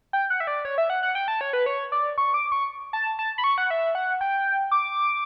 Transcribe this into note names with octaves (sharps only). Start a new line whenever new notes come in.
G5
F#5
E5
D5
C#5
E5
F#5
F#5
G5
A5
C#5
B4
C#5
D5
C#6
D6
C#6
A5
A5
B5
C#6
F#5
E5
F#5
G5
D6